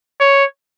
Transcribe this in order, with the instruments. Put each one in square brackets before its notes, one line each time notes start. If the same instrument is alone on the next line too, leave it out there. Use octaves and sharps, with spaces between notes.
[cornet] C#5